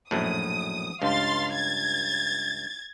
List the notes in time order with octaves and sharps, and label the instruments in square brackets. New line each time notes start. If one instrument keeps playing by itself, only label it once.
[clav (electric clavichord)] A#1 F#2 A2 [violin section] D#6
[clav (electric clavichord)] C#2 G2 [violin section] F5 C6 A6
[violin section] G#6 A6